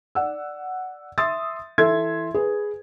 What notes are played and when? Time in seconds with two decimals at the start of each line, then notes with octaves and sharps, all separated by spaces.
0.15 D5 F#5 E6
1.18 E5 C6 D#6 E6 A6
1.78 E3 A4 E5 C6 G#6
2.34 G#4 B4